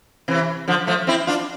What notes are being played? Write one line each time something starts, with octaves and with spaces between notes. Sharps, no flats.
C3 E3
D3 F3
F3 A3
C4 E4
D4 F4